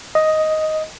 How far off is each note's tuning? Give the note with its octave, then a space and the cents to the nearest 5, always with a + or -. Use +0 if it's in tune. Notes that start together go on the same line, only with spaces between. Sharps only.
D#5 +5